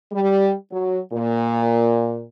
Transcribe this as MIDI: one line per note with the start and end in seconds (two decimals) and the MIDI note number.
0.12 0.52 55
0.72 1.00 54
1.12 2.23 46